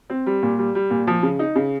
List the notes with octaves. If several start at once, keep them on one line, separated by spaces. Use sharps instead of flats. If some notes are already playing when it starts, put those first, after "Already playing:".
C4
G3
A#2
G3
G3
A#2
F3
C#3
D#4
C#3